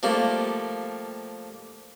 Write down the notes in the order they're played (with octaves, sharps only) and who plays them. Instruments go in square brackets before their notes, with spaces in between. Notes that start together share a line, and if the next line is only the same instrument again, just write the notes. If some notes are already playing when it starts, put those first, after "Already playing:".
[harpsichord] F3 G3 A3 A#3